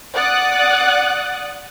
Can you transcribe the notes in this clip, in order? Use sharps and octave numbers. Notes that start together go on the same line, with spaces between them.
D5 F#5 D#6 F#6